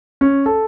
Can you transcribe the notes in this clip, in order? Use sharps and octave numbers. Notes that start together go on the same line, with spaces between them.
C#4
A4